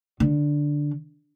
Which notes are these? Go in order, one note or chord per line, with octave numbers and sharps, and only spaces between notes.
D3